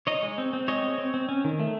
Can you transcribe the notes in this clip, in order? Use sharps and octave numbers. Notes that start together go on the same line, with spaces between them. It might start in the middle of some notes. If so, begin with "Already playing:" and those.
D#4 C#5 D#5
G#3
C4
C4
G#3 C#5 D#5
C4
C4
C4
C#4
D#3
A3